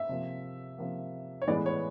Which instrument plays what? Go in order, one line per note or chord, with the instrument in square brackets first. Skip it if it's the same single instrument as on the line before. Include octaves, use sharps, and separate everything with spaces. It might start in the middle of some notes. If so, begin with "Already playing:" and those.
Already playing: [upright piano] E5
C3 F3 A#3
C3 F3 A#3
C#5
A2 E3 G#3 B3 D5
C#5